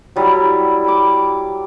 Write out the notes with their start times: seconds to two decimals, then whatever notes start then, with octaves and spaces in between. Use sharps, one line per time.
0.16 F#3 G3 E4
0.84 B5 D6